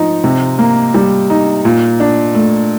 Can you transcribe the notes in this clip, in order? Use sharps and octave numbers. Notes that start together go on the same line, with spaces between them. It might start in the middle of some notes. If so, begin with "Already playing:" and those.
Already playing: F3 D#4
C3
A#3
G3
D#4
A#2
D4
A3